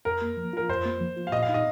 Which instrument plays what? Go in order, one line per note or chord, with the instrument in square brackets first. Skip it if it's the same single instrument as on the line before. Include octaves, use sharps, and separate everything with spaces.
[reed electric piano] F2 [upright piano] A#4
[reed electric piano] A#3
F3
[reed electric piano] F4 [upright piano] A#4
[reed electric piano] F2 [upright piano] C5
[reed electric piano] A#3
F3
F4
[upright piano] F5
[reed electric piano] A#2 [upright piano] D#5
[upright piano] F5
[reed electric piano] D#4
[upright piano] D#5